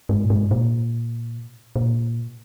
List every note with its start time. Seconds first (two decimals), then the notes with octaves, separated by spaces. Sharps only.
0.09 G#2
0.25 A#2
0.30 G#2
0.51 A#2
1.76 A#2